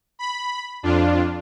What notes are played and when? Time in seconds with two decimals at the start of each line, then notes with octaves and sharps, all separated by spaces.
0.19 B5
0.83 F2 D4 F4